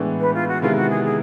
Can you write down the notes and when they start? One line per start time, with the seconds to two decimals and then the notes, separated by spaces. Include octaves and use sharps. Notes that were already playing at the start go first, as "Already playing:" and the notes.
Already playing: A2 E3 G#3 B3 D4
0.20 B4
0.34 F4
0.48 F#4
0.62 C3 D#3 G#3 B3 E4 F4
0.76 F#4
0.90 G#4
1.04 G#4